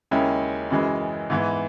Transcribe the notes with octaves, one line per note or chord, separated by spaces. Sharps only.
D#2 C#3 G#3 C#4 E4
F#2 C#3 E3 G#3
G#2 E3 B3